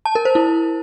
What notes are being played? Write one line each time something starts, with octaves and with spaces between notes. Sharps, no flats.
A5
A#4
C5
E4